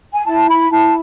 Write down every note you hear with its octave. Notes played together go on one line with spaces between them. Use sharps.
G#5
E4 A5
B5
E4 A5